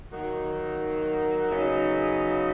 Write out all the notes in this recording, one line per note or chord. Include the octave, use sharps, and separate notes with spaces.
D#3 F#3 A#3 D#4 F#4
C#3 F#3 B3 D#4